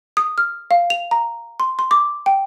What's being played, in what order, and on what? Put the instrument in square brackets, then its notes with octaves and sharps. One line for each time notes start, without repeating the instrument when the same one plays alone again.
[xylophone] D#6
F6
F5
F7
A#5
C6
C6
D6
G5